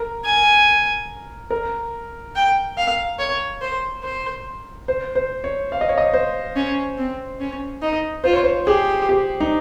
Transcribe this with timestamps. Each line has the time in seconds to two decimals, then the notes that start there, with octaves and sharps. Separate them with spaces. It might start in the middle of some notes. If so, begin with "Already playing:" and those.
Already playing: A#4
0.25 G#5
1.50 A#4
2.35 G5
2.77 F5
3.19 C#5
3.61 C5
4.03 C5
4.88 C5
5.15 C5
5.44 C#5
5.72 F5
5.81 D#5
5.89 C#5
5.98 D#5
6.14 C5
6.56 C#4
6.98 C4
7.40 C#4
7.82 D#4
8.24 F4 C5
8.33 C#5
8.44 C5
8.66 G4 G#4
9.09 G4
9.40 D#4